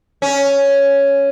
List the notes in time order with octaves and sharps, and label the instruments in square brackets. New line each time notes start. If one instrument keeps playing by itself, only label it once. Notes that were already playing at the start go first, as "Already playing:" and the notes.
[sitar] C#4